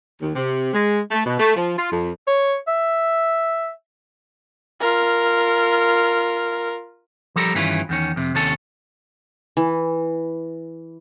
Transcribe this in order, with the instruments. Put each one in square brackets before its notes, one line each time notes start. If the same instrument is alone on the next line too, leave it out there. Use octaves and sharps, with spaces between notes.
[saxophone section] D#2
C3
G#3
A3
B2
A3
F3
F4
F2
[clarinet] C#5
E5
[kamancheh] F4 A#4
[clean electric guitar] F3 G3 A4 A#4
G2 D#3 E3 C#4 E4 F4
E2 D#3 C#4
F2 C3
D#2 C3 C#4 A4 A5
[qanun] E3